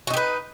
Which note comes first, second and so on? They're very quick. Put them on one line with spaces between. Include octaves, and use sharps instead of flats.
F#4 D#4 G4 B4